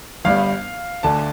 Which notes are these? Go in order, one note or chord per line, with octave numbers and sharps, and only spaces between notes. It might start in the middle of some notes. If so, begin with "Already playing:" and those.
G1 G2 G3 F5
D2 D3 A3 A5